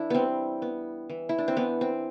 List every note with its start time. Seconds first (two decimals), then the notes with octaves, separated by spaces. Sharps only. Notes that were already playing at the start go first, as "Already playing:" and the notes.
Already playing: E3 D4 E4
0.10 G3 B3 C4
0.62 B3
1.09 E3
1.29 E4
1.38 D4
1.48 C4
1.57 E3 B3
1.81 C4